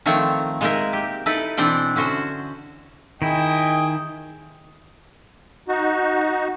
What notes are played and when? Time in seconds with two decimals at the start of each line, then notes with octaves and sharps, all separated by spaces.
0.06 D#3 F3 A3 C4 C#5
0.61 G#3 A#3 D#4 G#4 A#4 E5
0.93 G4
1.26 D#4 E4 A4 B4
1.57 B2 E3 C4 D4 E4 G5
1.96 D3 C#4 F#4 C5
3.22 D#3 E4 G#4 D#5 G5
5.68 D#4 F#4